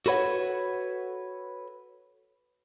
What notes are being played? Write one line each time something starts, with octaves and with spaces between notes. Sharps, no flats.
F#4 A4 B4 C#5 F#5